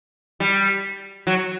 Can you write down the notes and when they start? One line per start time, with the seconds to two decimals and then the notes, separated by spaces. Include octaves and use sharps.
0.40 G3
1.27 F#3